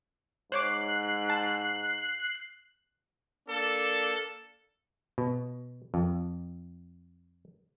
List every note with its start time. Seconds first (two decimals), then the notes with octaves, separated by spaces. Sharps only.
0.52 G#2 C5 C#5 D6 F#6 C7
1.30 A5
3.47 A#3 D4 A4
5.18 B2
5.94 F2